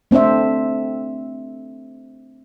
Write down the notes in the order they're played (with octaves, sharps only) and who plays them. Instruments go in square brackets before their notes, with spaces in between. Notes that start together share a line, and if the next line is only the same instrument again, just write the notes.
[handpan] A3 C4 D4 C5 E5